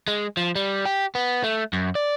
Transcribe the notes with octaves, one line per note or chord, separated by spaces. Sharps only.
G#3
F3
G3
G4
B3
A3
F#2
D5